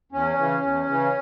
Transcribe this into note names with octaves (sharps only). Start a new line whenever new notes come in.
E2 C#4
C#3 E3
E2
C#3 E3